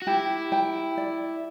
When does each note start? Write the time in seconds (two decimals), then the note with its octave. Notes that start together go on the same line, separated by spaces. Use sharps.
0.02 F#4
0.07 E4 G4
0.52 G5
0.97 D5